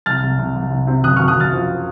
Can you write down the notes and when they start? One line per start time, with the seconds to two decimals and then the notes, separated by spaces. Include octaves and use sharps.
0.06 C2 F6 A6
0.23 C2
0.39 C2
0.56 C2
0.71 C2
0.87 C3
1.04 F#1 D#6 F#6
1.16 C#6 F6
1.20 F#1
1.28 D#6 F#6
1.36 F#1 F6 A6
1.53 F3